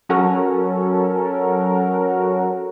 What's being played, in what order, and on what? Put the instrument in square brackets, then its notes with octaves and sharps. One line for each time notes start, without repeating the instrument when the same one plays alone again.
[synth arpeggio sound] F#3 C#4 F#4 A4 A#4